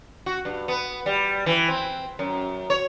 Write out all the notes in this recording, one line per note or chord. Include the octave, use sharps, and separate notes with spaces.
F#4
G2
B3
G3
E3
C4
F#2
C#5